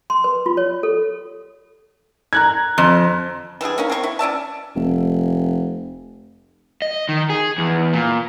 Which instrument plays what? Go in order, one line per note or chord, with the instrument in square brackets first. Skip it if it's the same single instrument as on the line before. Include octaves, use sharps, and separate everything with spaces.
[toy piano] C6
B4
F4
C#5
A4
[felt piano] A#5 F#6 G#6
[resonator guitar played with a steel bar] F2
[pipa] E3 G3 D4 G#4
A#3 C#4 D#4
C4 G#4 C#6
E4
C#4 D5 E5 A5
[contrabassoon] F1
[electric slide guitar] D#5
D#3
G#4
E2
A#2